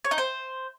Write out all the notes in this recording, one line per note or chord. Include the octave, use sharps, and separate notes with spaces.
C#5
D#4
C5